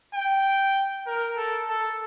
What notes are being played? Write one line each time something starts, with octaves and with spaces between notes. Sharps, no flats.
G5
A#4
A4
A4